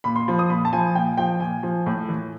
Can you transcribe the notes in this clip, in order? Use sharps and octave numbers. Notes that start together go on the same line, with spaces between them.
A#2 B5
C6
F3
D#6
A#2 B5
A5
F3 G#5
A#2 G5
F3 G5
A#2 G#5
F3
A2
E3